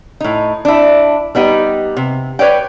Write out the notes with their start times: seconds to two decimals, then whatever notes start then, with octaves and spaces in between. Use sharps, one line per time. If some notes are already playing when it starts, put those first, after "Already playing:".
0.21 A2 D#4
0.65 D4 E4
1.35 G3 B3 D#4 G4
1.97 C3
2.39 B4 C#5 D5 G5